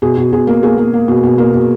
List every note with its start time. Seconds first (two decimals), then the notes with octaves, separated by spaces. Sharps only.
0.02 B2 G#4
0.17 B2
0.32 B2 G#4
0.47 A#3
0.63 A#3 G#4
0.78 A#3
0.93 A#3
1.08 B2
1.23 B2
1.38 A#3
1.54 B2